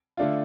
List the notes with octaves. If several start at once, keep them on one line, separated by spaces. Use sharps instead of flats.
D3 A3 D4 F4